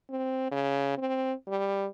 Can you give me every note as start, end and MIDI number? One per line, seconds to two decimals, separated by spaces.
0.10 0.50 60
0.52 0.93 49
0.98 1.33 60
1.48 1.87 55